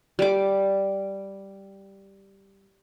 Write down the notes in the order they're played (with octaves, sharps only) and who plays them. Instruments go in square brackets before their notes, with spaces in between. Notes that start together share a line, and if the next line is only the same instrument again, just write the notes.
[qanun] G3 D6